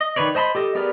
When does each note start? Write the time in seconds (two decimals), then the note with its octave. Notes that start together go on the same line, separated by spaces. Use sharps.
0.01 D#5
0.16 D#3 D#4 B4 C#5 D5
0.35 C5 D#5 A5 B5 C6
0.55 G4 A4 D#5
0.75 B3 G4 G#4 A#4 D5